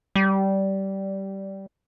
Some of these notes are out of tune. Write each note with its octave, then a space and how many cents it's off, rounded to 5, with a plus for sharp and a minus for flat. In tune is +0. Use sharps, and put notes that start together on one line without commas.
G3 -15